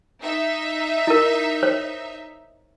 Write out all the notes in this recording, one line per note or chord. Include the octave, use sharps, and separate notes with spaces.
D#4 E5
E4 A#4
C5 C#5